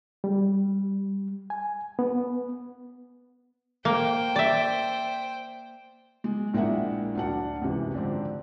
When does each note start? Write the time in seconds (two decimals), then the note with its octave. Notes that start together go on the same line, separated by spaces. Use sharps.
0.24 G3
1.50 G#5
1.99 B3
3.85 A#3 C5 G5
4.36 D5 E5
6.24 G#3
6.54 A#1 G#3 A#3 E4 E5 F#5
7.15 D2 F#3 D4 F#5
7.61 C#2 F#2 C3 E3
7.94 G#2 D3 F3 C4